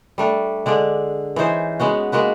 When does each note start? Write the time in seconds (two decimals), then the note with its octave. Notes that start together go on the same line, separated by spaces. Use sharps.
0.18 G3 A3 D4
0.66 D3 G#3 D4 D5
1.36 E3 C#4 D#4 C5
1.80 G#3 B3 C#4 F#4
2.12 G#3 A#3 F#4 B4